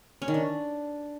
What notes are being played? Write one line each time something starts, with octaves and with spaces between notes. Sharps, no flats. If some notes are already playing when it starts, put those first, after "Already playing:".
C#4
D#3
D4